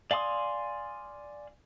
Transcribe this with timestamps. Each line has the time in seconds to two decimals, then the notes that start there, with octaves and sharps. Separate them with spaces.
0.11 D5 F5 G#5 C6 D#6